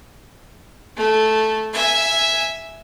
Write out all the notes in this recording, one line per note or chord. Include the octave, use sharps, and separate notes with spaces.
A3
E5 G#5